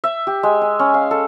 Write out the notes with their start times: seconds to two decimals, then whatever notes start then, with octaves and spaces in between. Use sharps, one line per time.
0.04 E5
0.27 G4
0.43 G#3
0.62 G#5
0.79 C#4
0.94 F5
1.11 A4